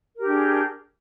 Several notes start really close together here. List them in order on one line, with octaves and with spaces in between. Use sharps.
A#4 G4 D4 G#4